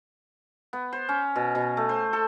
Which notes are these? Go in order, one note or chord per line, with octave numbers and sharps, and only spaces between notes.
B3
C5
C#4
B2
B2
A3
C5
A4